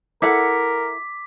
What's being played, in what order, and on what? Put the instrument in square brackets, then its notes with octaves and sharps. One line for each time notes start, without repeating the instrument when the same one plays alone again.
[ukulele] E4 A4 F#5 [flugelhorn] A#4 [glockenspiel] D6 B6